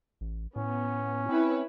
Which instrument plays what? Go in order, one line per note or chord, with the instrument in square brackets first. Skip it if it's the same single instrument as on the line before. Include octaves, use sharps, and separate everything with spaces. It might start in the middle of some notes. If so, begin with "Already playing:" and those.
[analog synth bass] A1
[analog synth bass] A2 [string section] B3 [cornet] C#4
[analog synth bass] C4 [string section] E4 B4 C#5